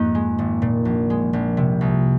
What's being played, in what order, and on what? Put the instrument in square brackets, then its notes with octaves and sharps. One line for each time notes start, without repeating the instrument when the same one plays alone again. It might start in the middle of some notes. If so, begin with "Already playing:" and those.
Already playing: [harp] F2 G#2 C4 D#4 [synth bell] A#3
[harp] G#3
G#1
A#2
A#1
G#3
A#1
C3
C2